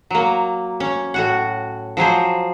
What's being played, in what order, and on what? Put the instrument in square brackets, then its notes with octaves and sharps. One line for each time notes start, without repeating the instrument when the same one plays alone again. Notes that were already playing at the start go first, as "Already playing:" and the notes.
[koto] F#3 A#3
C#4
A2 F#4 F#5
F3 F#3 G#4 C5